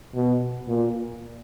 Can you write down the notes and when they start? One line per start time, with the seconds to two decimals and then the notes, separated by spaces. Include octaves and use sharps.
0.15 B2
0.68 A#2